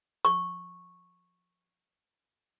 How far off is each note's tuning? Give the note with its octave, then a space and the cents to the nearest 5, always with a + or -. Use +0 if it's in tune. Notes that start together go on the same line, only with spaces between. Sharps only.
C#6 -10